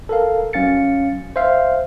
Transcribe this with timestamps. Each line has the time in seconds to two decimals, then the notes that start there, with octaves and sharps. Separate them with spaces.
0.09 A4 A#4 F5
0.53 F#3 C#4 F5 A6 C#7
1.36 C5 E5 F5